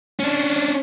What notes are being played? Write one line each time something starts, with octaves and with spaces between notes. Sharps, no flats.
C#4 D4